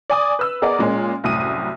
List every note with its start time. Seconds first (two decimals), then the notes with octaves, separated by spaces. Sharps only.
0.10 D5 G#5 D#6
0.39 B4 E6
0.62 B3 G#4 A#4 D5 D#5
0.79 A#2 G#3 A#3 C#4
1.24 C2 F#2 A2 D#6 D#7